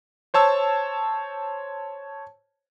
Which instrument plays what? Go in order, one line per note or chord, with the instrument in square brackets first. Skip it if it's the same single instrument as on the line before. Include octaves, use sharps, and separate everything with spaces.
[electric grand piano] C5 C#5 A5 E6